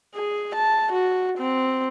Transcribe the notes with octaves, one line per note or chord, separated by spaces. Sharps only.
G#4
A5
F#4
C4